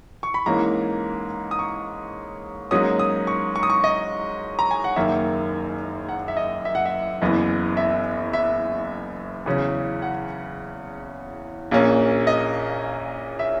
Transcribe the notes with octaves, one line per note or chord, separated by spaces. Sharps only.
C#6
B5
G#2 E3 A#3 C#4 A#5
D#6
C#6
G#2 F#3 A#3 C#4 D#6
D#6
C#6
C#6
D#6
C#6
D#5
A#5
G#5
F#5
F#1 F#2 D#3 A#3 E5
F#5
E5
D#5
E5
F#5
E5
F#1 F#2 E3 B3
E5
E5
E2 C#3 F#3 C#4
F#5
A#1 A#2 A#3 C#4
D#5
E5